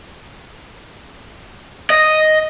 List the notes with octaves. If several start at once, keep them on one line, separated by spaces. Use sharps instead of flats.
D#5